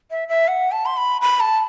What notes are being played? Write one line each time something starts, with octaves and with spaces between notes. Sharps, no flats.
E5
E5
F#5
A5
C6
B5
B5
A5